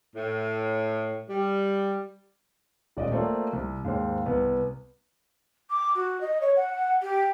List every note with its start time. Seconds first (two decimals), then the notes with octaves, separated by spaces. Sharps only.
0.15 A2
1.29 G3
2.97 D#1 D5 D#5
3.12 A3 A#3 C4 F4 C5 D5
3.53 C2
3.84 D#2 G#2 C5
4.26 C2 B3
5.70 D6
5.95 F#4
6.21 D#5
6.40 C#5
6.56 F#5
7.01 G4